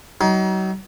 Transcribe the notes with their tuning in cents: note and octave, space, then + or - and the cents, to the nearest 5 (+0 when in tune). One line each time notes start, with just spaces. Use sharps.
F#3 +40 D#4 +30